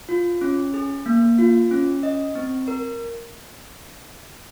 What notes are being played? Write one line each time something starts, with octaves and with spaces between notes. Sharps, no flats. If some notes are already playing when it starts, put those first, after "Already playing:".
F4
C#4
G#4
A#3
F4
C#4
D#5
C4
A#4